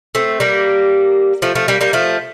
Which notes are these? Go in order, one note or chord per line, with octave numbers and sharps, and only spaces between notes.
A3 C4
G3 A#3
F3 A3
F3 A3
G3 A#3
G3 A#3
F3 A3